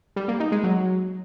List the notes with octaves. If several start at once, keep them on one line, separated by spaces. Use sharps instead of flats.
G3
A#3
D#4
G#3
F#3